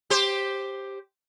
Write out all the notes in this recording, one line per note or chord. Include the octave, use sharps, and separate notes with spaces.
G4 C5